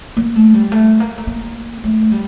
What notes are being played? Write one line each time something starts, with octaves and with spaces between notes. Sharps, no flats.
A#3
A3
G3
A3
A#3
A3
A#3
A3
G3